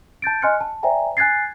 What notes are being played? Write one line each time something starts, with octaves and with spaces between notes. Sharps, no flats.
A5 G6 A6 D7
D#5 G#5 C6 F6 F#6 C#7
A5
C5 D5 E5 G5 G#5 A#5
G#5 F#6 G#6 A6 C7